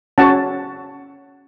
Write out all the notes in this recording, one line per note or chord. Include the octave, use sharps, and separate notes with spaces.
C#4 F#4 C#5 F#5 A5